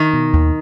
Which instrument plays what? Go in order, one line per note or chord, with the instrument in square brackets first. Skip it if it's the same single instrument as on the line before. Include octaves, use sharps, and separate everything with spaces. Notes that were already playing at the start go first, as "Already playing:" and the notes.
Already playing: [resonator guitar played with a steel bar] D#3
[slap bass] B2
D#2